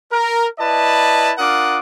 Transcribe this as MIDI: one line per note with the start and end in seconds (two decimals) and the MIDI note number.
0.12 0.46 70
0.59 1.32 64
0.59 1.32 71
0.59 1.32 74
0.59 1.32 75
0.59 1.32 81
1.38 1.80 62
1.38 1.80 65
1.38 1.80 70
1.38 1.80 78
1.38 1.80 86
1.38 1.80 87